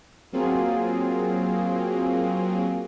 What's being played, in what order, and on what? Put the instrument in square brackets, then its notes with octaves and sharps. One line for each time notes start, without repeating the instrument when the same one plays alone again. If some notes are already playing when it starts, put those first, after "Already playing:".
[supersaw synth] F#3 A#3 C4 F4 G#4